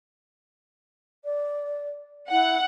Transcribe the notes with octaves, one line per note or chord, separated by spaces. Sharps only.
D5
E4 F#5